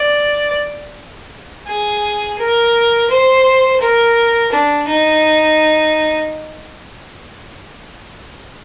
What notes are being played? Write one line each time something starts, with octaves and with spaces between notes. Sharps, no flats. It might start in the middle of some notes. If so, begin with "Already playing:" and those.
Already playing: D5
G#4
A#4
C5
A#4
D4
D#4